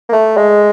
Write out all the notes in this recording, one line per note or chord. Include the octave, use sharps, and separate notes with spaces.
A#3
A3
G#3